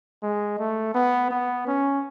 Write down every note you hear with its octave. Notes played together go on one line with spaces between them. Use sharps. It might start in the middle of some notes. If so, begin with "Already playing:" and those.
G#3
A3
B3
B3
C#4